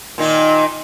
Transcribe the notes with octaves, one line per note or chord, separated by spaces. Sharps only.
A#2 D#3 D#4